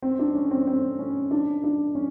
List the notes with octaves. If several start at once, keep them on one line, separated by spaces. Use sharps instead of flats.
C4
D4
C#4
C4
C4
C#4
D4
D4
C#4